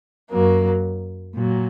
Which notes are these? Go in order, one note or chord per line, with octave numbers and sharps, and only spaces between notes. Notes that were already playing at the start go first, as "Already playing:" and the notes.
F#2 F#3 A#3
A#2 F#3